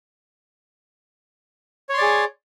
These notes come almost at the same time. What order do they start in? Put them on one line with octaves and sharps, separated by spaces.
C#5 C6 D5 G#4